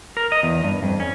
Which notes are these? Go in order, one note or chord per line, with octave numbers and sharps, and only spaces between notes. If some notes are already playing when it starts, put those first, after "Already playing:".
A#4
D#5
E2
G2
F2
C#4